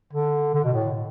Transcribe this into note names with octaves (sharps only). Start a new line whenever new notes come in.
D3
D3
B2
A2